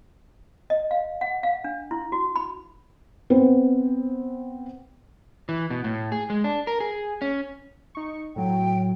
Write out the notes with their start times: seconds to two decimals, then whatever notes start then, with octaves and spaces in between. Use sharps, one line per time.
0.70 D#5
0.91 F5
1.21 F#5
1.43 F5
1.64 D4
1.91 E4
2.12 F#4
2.36 B5
3.30 B3 C4 B4
5.49 E3
5.70 B2
5.84 A2
6.12 G#4
6.30 G#3
6.44 D4
6.67 A#4
6.80 G#4
7.22 C#4
7.95 D#4 C#6
8.36 A2 F#3 G5